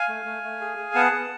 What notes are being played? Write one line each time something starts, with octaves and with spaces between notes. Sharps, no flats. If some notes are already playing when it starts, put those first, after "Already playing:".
Already playing: F5 G#5
A3
A3
A3
G#4
G#4
B3 F#5 A5
B3